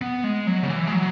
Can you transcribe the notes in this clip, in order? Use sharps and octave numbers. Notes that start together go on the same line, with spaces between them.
B3
G#3
F#3
C#3
E3
G#3
F#3